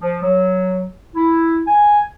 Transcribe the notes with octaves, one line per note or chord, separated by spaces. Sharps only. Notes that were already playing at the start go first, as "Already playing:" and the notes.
F3
F#3
E4
G#5